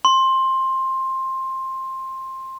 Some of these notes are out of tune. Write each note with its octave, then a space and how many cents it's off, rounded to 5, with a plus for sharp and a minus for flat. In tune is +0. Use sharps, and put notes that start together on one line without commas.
C6 +15